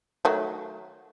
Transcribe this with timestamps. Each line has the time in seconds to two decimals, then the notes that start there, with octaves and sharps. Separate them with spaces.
0.25 D#3 F#3 A3